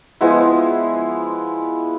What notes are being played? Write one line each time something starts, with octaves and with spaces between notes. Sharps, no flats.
F3 G#3 B3 E4